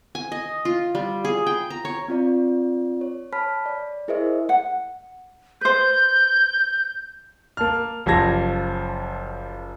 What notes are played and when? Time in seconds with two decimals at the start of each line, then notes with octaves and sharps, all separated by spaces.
0.15 G#5
0.32 D#5
0.65 F4
0.95 G3
1.25 G#4
1.46 G5
1.70 A#5
1.85 C#5
2.08 C4 F4 D5
3.01 C#5
3.33 C#5 A5 B5 F6 B6
3.66 D5
4.08 E4 G#4 A#4 C5 D#5 E5
4.49 F#5
5.61 B4 C5 G6
7.57 A#3 A5 F6
8.06 F#1 F3 G4 A5 G#6 A#6